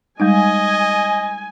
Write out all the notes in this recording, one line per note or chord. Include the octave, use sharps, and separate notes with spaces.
G3 G#3 D#4 D#5 G#5